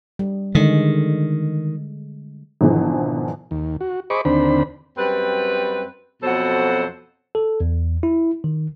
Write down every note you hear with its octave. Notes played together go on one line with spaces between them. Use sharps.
G3
D3 D#3 G#3
G#1 B2 D3 E3 F3
D#2
F#4
G#4 C5 D#5 B5 C#6 D6
D#2 D3 C4 D4 C5 B5
F#2 G3 C4 B4
F2 B2 F#3 A4 C5 F#5
A4
E2
E4
D#3